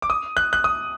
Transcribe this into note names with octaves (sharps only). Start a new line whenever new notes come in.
D6
D#6
F#6
F#6
D#6